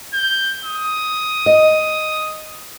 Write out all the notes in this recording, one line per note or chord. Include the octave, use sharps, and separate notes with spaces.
G6
D#6
D#5